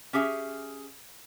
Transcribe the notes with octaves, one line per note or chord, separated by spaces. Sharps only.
C#4 G4 G#4 E5